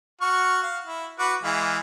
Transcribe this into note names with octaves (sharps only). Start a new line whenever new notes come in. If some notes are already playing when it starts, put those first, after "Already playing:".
F#4 C#6 F6
F5
E4
F#4 B4 D6
E3 G#3 F5